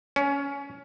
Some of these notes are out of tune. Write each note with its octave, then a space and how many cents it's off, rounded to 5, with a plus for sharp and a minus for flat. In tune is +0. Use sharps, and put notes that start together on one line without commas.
C#4 +15